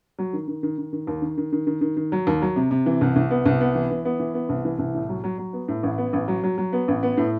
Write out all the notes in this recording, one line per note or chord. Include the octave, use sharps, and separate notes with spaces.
F#3
D#3
D#3
D#3
D#3
D#3
D#2
D#3
D#3
D#3
D#3
D#3
D#3
F#3
D#2
F#3
C3
C3
E3
C2
C2
B3
C2
B3
E3
E3
B3
E3
B3
C2
E3
C2
A2
F#3
F#3
F#3
B3
A2
A1
B3
A1
F#3
F#3
F#3
B3
A1
B3
A2